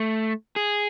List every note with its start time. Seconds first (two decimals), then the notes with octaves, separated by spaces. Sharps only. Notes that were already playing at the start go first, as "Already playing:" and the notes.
Already playing: A3
0.56 G#4